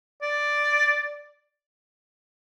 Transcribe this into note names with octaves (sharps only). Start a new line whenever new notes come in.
D5